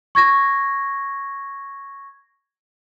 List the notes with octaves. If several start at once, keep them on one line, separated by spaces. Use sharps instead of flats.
C#6 G#6 A#6